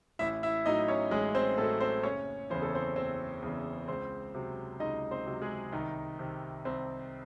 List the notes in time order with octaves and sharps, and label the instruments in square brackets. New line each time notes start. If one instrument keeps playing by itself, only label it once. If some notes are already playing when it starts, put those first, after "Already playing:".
[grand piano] A1 E4 E5
E4 E5
A2 F#3 D#4 D#5
C#4 C#5
A1 G#3 G#4
C4 C5
A2 F#3 A3 A4
C4 C5
F#1 C#4 C#5
E2 C#3 E3 C5
A4
C4 C5
F#1 C4 C5
E2 C#3 E3
C#2 C4 C5
C3 F#3
C#2 D#4 D#5
C4 C5
C3 F#3
G#3 G#4
C2 D#3 D#4
C3 D#3
C2 C4